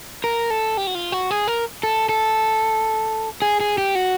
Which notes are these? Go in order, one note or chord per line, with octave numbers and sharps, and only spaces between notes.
A#4
A4
G4
F#4
F4
F#4
G#4
A#4
A4
A4
G#4
G#4
G4
F#4